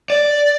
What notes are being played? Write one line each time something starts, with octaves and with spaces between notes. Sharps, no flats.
D5